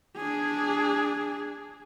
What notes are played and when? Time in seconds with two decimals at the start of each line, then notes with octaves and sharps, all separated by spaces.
0.17 D4 G#4